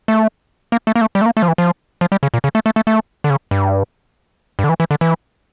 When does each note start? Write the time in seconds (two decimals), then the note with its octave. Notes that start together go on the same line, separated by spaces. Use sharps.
0.08 A3
0.72 A#3
0.87 A3
0.95 A#3
1.01 A3
1.15 G3
1.21 A3
1.26 A#3
1.37 A3
1.42 F3
1.48 E3
1.58 F3
2.01 F3
2.12 G3
2.23 C#3
2.34 A#2
2.44 C#3
2.55 A3
2.66 A3
2.76 A3
2.87 A3
3.24 D3
3.30 C#3
3.51 G2
4.59 G2
4.64 D3
4.69 E3
4.80 E3
4.91 D3
5.01 E3